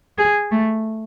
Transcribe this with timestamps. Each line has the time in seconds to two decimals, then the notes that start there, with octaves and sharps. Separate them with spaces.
0.18 G#4
0.51 A3